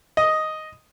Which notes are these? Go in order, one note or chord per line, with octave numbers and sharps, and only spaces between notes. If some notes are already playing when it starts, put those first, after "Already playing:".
D#5